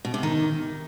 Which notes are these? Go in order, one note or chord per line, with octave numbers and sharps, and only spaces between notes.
B2
C3
D#3